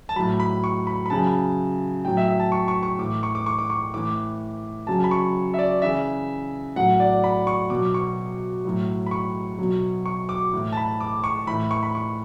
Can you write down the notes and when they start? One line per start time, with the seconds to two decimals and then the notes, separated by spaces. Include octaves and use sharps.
0.09 A5
0.16 A2 F#3 B5
0.40 B5
0.64 C#6
0.87 B5
1.06 B5
1.10 C#3 F#3 A5
2.05 A2 F#3 G5
2.17 E5
2.28 E5
2.40 A5
2.52 C#6
2.68 C#6
2.83 C#6
2.99 A2 E3 D6
3.23 C#6
3.35 D6
3.46 C#6
3.59 D6
3.70 C#6
3.94 A2 E3 D6
4.87 C#3 F#3 A5
5.04 B5
5.11 C#6
5.54 E5
5.59 D5
5.82 C#3 E3 E5
6.76 A2 F#3 F#5
7.00 D5
7.24 B5
7.47 C#6
7.70 B2 F#3 D6
7.94 C#6
8.65 A2 F#3
9.06 B5
9.11 C#6
9.58 B2 F#3
10.06 C#6
10.29 D6
10.53 A2 E3
10.72 A5
10.77 B5
11.00 D6
11.24 C#6
11.47 A2 E3 B5
11.71 C#6
11.83 B5
11.95 C#6